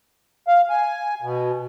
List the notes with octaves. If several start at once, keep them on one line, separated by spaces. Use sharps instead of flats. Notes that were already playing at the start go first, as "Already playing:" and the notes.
F5
G#5
B2